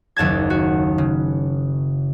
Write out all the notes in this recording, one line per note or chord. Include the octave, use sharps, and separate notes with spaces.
F#1 D#2 A5 G#6
F#4
C#3